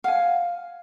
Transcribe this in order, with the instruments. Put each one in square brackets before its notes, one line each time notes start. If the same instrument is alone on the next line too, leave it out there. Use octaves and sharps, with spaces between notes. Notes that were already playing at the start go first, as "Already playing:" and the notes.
[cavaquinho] F5 [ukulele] F#5 G#5